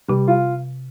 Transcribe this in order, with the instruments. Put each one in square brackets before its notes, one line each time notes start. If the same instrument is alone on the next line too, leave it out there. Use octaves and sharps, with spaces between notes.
[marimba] C3 [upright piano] G3
[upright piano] F4